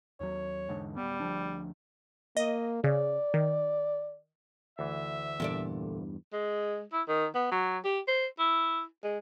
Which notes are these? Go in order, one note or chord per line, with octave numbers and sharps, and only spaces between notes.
D#2 F#3 C#5
E2 G#2 D3
D1 A#1 G3 B3
D2 F3 D4
A#3 D#5
C#3 D5
D#3
D2 E3 E5
E2 G2 A#2 A4 D5
G#3
E4
D#3
B3
F#3
G4
C5
E4
G#3